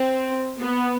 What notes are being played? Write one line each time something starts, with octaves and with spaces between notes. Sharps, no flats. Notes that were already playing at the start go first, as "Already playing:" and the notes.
Already playing: C4
B3